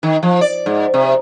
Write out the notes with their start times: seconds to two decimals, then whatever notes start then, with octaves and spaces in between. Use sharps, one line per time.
0.03 D#3
0.23 F3
0.41 D5
0.66 G#2
0.94 C3